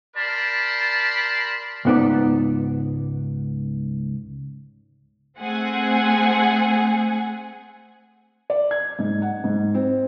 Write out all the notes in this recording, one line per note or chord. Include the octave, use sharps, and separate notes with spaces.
G4 A#4 D5 A5 B5 C6
C#2 G#2 B3 D#4 D5
A3 C4 G#4 F#5 G#5
D5
G#6
G#2
F#5
G#2
C4